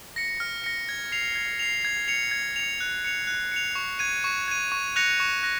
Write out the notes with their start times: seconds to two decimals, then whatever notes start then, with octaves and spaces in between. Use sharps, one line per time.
0.16 A#6 C#7
0.40 F6
0.64 A#6 C#7
0.89 G#6
1.12 C7 F7
1.35 G#6
1.59 C7 F7
1.85 G#6
2.08 C#7 F7
2.31 G#6
2.56 C#7 F7
2.81 F#6
3.04 C#7 F7
3.27 F#6
3.52 C#7 F7
3.75 C#6
3.99 G#6 D#7
4.24 C#6
4.48 G#6 D#7
4.72 C#6
4.96 F#6 A#6 C#7 F7
5.20 C#6
5.43 F#6 A#6